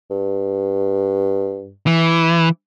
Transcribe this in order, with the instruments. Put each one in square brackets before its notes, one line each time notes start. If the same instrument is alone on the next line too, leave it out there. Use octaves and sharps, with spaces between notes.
[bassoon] G2
[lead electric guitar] E3